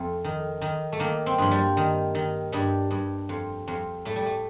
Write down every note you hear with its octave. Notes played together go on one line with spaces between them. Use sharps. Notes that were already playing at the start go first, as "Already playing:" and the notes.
Already playing: F2 A3
D#3
D#3
A3
D#3 A#3
C4
G2 F3
G3
D#3
D#3
G2 G3
G2
F2
F2
A2 A3
G3
A3